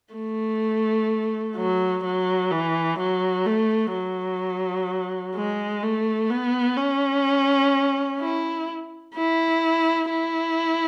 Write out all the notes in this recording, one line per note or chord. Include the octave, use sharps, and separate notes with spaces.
A3
F#3
F#3
E3
F#3
A3
F#3
G#3
A3
B3
C#4
E4
E4
E4